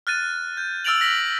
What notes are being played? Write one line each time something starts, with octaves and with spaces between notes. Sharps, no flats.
F6 F#6 A6 D#7
G6
E6 F6 A6 D7 F7 F#7
A#6 B6 F#7